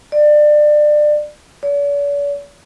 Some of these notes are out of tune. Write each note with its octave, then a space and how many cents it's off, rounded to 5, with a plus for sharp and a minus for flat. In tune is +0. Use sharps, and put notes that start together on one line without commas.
D5 +25
D5 -45